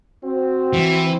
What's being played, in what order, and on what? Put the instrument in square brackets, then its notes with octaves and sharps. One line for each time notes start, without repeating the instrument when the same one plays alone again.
[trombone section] C4 [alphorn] F#4
[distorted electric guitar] E3